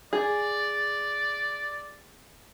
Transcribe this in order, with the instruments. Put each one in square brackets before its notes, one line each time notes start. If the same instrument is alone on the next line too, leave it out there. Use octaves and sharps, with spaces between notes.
[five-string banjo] G#4 [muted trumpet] D5